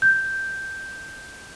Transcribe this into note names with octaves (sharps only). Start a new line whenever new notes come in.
G6